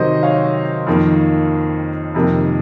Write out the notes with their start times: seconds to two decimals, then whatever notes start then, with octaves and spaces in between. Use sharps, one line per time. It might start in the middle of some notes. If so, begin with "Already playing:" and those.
Already playing: C3 D#3 F#3 C5 D#5
0.23 C#5 F5
0.87 F2 D#3 A#3
2.15 F2 C3 D#3 A#3